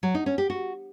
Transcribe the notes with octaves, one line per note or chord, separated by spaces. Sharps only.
F#3
D#4
C#4
G4
F#4